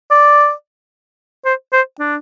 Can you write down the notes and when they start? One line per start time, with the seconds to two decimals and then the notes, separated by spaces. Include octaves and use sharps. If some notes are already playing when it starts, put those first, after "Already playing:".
0.11 D5
1.45 C5
1.73 C5
2.00 D4